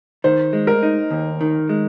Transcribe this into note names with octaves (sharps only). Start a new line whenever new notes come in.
D#3 C5
G#3
A#4
D#4
D#2
D#3
G#3